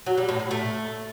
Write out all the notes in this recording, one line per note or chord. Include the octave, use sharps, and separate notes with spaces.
F#3
G3
A2
A2
A3